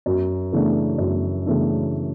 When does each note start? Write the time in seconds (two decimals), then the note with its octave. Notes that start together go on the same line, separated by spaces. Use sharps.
0.06 F#2
0.52 C#3 E3 A3 D4
0.98 F#2
1.45 C#3 E3 A3 D4